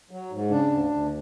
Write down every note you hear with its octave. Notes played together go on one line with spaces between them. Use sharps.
F#3
G#2
C#3 D4
D2
D2